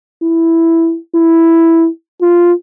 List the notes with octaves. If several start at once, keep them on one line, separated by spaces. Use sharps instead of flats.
E4
E4
F4